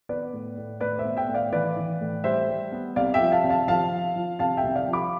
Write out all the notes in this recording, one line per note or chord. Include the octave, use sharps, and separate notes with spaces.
B3 B4 D5
A2
A2
A2 B4 D5
C5 E5
B3
E5 G5
A2
D5 F5
E3 B4 D5
E3
A2
G3 C5 E5
G3
B3
C2 D5 F5
E5 G5
F3
F5 A5
C3
F5 A5
F3 F5 A5
F3
F3
C3 F5 A5
E5 G5
C2
D5 F5
F3
B5 D6